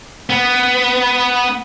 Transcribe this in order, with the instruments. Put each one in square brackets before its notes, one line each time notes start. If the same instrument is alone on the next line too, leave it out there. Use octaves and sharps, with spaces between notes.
[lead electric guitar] B3